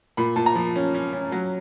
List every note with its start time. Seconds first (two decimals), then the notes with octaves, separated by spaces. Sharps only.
0.17 A#2 B5
0.36 A#2 A5
0.46 A#5
0.55 F3
0.76 C#4
0.94 C#4
1.13 C#4
1.32 F#3